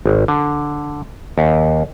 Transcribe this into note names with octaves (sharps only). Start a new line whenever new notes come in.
G#1
D3
D#2